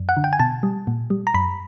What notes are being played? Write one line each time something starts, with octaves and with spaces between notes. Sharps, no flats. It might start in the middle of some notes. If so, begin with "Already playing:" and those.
Already playing: F#2
F#5
D3
G5
G#5
B2 A5
G3
A#2
G3
A#5
F#2 B5